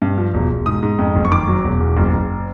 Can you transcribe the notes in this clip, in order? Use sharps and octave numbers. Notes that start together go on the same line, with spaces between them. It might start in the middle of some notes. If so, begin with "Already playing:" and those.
G2
F3
E1
E1
G#2 D#6
G#2
F2
F#1
C#6
D#3 D6
F#3
E1
E2
F#1
F#1